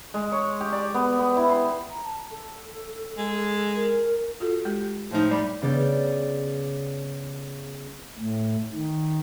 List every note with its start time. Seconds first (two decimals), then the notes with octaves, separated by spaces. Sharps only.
0.14 G#3
0.32 C#5
0.61 G4
0.73 D5
0.94 B3
1.19 B3
1.37 E4
1.49 C6
1.90 A#5
2.04 A5
2.31 A4
3.18 G#3
3.75 A#4
4.40 F4 F#4 A4
4.65 G#3 G4
5.11 A2 F3 D#4
5.31 G3 D5 B5
5.62 C#3 G3 B3 D5 G6 A6
8.19 A2
8.73 D#3